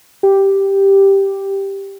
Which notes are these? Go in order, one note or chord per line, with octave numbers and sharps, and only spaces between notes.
G4